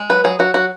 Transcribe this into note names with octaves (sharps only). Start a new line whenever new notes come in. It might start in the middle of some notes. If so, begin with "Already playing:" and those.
Already playing: G#3
F#3 B4
F#3 G#4
F#3 F#4
F#3 F#4